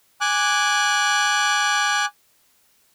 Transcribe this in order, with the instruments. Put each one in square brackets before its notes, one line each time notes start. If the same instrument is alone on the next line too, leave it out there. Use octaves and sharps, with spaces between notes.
[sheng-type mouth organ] G#5 D6 F#6